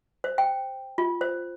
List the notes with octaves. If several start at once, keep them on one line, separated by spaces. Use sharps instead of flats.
C5
G5
F4
C5